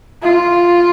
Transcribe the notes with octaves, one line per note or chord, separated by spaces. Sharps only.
F4